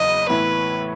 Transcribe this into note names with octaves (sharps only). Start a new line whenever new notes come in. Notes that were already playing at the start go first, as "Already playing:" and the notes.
Already playing: F#1 E2 C#3 F#3 D#5
A2 E3 B3 E4 B4